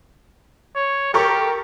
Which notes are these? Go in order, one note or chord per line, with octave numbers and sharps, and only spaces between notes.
C#5
G4 A4 A#4 C#6